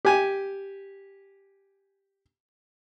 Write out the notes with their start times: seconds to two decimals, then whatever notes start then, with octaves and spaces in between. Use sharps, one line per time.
0.05 G4 G#5